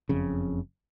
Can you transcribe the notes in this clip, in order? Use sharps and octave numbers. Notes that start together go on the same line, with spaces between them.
F#1 F2 C#3